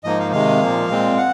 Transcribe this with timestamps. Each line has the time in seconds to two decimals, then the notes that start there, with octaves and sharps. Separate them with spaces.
0.04 G#2 F3 A#3 D#4 D#5
0.19 F5
0.32 C3 D#3 G#3 F5
0.61 A#2 F3 A#3
0.89 A#2 G#3 C4
1.18 F#5